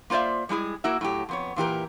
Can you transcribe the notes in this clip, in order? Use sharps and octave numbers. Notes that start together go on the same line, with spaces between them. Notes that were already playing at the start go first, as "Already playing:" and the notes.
A#3 F4 C5 D5 E5
G3 G#3 E4 G#4
A#3 E4 F#4 E5
A2 F#3 G4
F2 B3 C#5
A#2 E3 G4 A#4